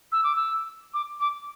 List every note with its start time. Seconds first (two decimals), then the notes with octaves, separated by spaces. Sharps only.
0.12 E6
0.24 D6
0.36 E6
0.94 D6
1.20 D6